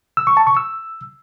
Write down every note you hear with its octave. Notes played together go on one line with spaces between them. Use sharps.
E6
C#6
A5
C#6
E6